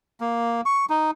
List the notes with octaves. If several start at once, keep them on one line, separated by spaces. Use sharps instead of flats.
A#3
C#6
D#4